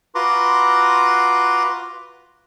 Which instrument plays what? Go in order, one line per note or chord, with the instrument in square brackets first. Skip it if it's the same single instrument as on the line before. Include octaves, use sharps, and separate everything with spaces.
[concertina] F4 F#4 B4 A#5 C6 D6